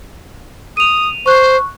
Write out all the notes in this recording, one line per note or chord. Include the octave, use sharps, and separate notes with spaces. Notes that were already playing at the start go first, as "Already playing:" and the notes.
D#6 D#7 F7
C5 C#6 F#6